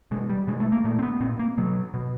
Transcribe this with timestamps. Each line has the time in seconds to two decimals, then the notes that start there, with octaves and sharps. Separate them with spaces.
0.11 B2 G#3
0.30 G3
0.47 B2 G#3
0.60 A3
0.72 A#3
0.84 A#2 A3
0.99 C4
1.03 B3
1.20 A#2 C4
1.39 A#3
1.58 B2 F#3
1.94 B2